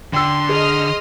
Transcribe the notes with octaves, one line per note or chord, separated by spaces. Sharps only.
D3 G5 C6 E6
G#4 D#5 D#6 F6